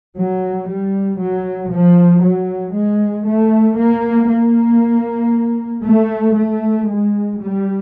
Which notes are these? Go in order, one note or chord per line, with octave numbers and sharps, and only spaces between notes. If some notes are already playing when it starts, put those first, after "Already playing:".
F#3
G3
F#3
F3
F#3
G#3
A3
A#3
A#3
A3
A3
G#3
G3